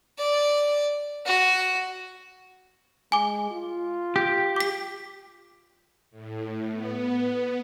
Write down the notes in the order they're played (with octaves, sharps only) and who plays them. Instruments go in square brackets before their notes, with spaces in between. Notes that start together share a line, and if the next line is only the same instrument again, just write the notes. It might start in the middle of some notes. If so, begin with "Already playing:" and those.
[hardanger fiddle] D5
F#4
[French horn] G#3 [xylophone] G#5 D6
[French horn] F4
[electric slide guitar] G4
[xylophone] D6 B6
[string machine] A2
B3